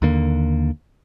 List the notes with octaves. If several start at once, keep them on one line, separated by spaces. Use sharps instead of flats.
D#2 D3 A#3